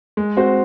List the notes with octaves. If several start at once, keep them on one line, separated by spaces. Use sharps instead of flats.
G#3
C4 F#4 C5